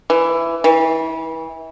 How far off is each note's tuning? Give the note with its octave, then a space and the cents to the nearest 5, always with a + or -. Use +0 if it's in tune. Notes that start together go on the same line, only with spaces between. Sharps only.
E3 +15
E3 -30